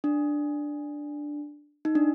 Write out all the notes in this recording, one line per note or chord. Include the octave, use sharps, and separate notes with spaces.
D4
D#4
D4